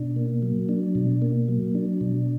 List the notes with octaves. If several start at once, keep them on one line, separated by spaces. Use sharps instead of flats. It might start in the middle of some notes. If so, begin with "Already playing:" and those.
Already playing: B2 D4
A#3
F#3
D4
B2
A#3
F#3
D4
B2